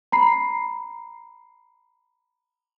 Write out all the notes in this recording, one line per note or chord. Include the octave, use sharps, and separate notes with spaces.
A#5 B5 C7